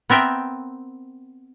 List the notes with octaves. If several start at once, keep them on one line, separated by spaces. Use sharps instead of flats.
B3 C4 A#4 E5 G5